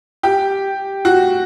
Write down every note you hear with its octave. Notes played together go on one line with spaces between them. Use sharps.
G4
F#4